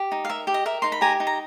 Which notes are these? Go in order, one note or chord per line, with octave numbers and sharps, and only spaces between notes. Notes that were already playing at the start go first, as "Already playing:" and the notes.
Already playing: G4
D#4
F5
A#4 E5
G4
D#5
A#4 E5
D#4 C6
B5
G4 G#5 A#5
D#4
A#5